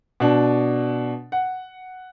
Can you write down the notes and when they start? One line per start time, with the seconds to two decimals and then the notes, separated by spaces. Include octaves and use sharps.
0.20 B2 D4
1.32 F#5